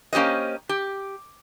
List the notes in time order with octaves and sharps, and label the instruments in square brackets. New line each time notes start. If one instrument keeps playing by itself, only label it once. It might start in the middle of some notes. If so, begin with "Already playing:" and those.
[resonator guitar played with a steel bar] A#3 C#4 G4 C5 D#5
G4